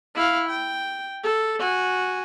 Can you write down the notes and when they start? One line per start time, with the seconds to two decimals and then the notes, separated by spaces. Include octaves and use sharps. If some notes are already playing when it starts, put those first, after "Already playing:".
0.15 E4 F5
0.49 G5
1.24 A4
1.59 F#4 G#5